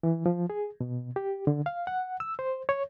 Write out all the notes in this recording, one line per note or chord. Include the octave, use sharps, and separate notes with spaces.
E3
F3
G#4
B2
G4
D3
F5
F#5
E6
C5
C#5